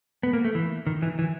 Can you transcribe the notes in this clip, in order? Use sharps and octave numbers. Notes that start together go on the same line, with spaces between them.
B3
A#3
A3
E3
D#3
E3
E3